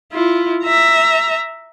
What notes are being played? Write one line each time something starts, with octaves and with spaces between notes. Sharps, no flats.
E4 F4
E5 A#5